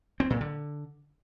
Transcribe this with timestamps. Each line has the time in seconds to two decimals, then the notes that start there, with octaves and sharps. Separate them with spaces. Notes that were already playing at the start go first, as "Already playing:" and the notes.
0.20 C4
0.30 A#2
0.41 D3